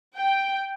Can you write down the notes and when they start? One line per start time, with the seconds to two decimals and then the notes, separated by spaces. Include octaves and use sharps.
0.17 G5